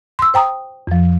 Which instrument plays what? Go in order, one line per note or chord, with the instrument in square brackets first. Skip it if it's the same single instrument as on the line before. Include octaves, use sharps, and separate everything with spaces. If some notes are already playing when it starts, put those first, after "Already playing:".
[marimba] C6 E6
C5 G5 A#5 D#6
F2 F3